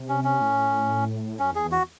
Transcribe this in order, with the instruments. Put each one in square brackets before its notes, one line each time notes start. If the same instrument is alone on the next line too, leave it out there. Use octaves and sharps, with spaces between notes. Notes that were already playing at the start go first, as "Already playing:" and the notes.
Already playing: [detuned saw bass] C3
[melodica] C#4
C#4
[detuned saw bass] A2
[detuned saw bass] F#2 [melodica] C#4
[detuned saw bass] E2 [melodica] G#4
[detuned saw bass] E2
[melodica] F#4